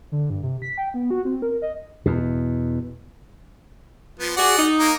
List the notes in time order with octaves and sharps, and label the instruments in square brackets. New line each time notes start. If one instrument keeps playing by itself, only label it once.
[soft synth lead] D3
G2
C3
B6
G5
B3
F#4
C4
A#4
D#5
[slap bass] E2 B2
[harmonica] F3 B3
[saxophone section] F#4 G#4 [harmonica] D5 F#5
[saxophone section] D#4
[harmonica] A#3 A#4